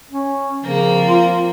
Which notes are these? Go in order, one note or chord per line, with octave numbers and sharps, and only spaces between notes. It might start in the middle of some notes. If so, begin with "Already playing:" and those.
C#4
C#3 F3 A#3 C4
F4